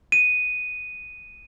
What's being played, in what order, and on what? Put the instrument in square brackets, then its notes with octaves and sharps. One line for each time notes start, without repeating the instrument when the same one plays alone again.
[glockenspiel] D#7